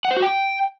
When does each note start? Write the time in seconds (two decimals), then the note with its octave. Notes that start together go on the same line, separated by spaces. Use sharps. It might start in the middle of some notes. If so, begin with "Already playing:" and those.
0.05 F#5
0.11 C5
0.17 F#4
0.22 G5